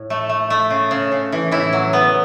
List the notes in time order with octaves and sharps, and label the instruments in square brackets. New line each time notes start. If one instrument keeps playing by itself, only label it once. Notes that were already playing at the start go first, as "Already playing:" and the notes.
Already playing: [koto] A2
A3
A3
A3
C#3
C#3
C#3
E3
A2 E4
F#3
B3